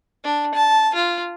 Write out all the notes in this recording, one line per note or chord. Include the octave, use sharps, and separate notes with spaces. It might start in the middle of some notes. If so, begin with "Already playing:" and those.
D4
A5
F4